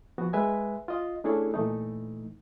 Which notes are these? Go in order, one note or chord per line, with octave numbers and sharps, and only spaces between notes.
F3 B3 F#4
G#3 B4 E5 G#5
F4 D#5
A3 C#4 D4 E4 G#4 A4
A#2 E3 A3 D#4